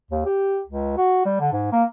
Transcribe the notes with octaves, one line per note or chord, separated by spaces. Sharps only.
D#2
G4
C#2
F#4
G3
D3
G#2
A#3